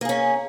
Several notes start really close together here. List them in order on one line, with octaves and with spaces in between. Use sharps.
A#3 G#4 C#4